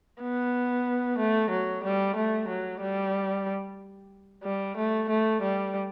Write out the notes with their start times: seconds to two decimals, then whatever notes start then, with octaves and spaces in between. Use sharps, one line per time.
0.22 B3
1.18 A3
1.51 F#3
1.84 G3
2.16 A3
2.49 F#3
2.81 G3
4.43 G3
4.77 A3
5.10 A3
5.42 G3